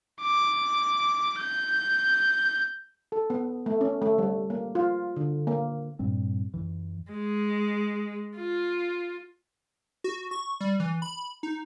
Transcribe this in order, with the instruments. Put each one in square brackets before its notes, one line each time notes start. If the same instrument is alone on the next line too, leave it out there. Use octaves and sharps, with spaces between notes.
[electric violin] D6
G6
[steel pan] A4
B3
A3
C#4
A3
G3
A#3
F4
D3
A#3
[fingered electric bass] G2 A#2 G3 C4
F#2 E3
[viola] G#3
F4
[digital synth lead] F#4
C#6
G3
E3
B5
D#4